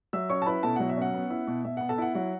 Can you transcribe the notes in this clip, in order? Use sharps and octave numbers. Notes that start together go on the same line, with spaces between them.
F#3 E5 E6
C#4 C#5 C#6
A5
E4 B4 B5
B2 A4 A5
F#3 F#5
E5
C#4 F#5
B3
E4
B2
B2 E5
B3 F#5
A4 A5
E4 F#5
F#3 F#5